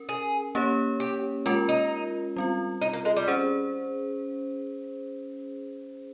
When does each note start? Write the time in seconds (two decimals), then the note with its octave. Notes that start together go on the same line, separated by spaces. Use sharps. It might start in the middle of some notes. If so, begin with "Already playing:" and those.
Already playing: C#4 A#4
0.09 G#4
0.55 A#3 C#4 G4 C#5
1.00 G4
1.46 G#3 C#4 F4 G4 A#4
1.69 D#4
2.36 G3 C4 F4
2.81 D#4
2.93 A#3
3.05 G#3
3.16 G3
3.28 C#4 G#4 C5